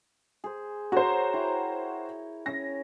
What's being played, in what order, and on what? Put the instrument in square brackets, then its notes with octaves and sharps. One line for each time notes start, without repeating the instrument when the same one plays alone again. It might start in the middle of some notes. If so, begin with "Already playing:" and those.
[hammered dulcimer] G#4 C5
[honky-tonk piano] F#4 C5 [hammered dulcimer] A#4 C#5
[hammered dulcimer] E4 G5 A#5
[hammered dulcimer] C#4 [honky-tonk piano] A#6